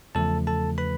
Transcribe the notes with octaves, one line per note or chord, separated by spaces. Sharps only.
E2 C#3 F3 A3 A4 A5
A4 A5
B4 B5